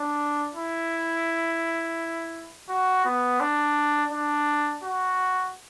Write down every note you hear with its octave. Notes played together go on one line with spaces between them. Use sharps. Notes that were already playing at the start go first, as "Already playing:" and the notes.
Already playing: D4
E4
F#4
B3
D4
D4
F#4